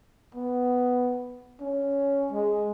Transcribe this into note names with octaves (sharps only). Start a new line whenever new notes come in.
B3
C#4
G#3